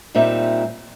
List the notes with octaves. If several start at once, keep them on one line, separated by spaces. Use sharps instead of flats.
A#2 G3 C4 D#4 E5